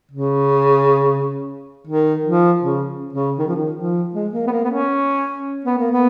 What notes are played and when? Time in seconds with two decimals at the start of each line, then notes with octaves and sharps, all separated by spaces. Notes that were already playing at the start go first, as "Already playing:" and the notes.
0.11 C#3
1.87 D#3
2.25 F3
2.63 C#3
3.13 C#3
3.38 D#3
3.47 F3
3.56 D#3
3.76 F3
4.14 G#3
4.32 A#3
4.47 B3
4.51 A#3
4.64 B3
4.70 C#4
5.65 B3
5.78 A#3
5.91 B3